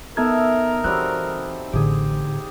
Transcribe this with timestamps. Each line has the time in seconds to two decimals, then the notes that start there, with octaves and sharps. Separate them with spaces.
0.17 B3 D#4 A4 A#4 E5 G#6
0.84 E3 F#3 G3 C4 F#6
1.73 A1 A2 D3 C4 G4 G#4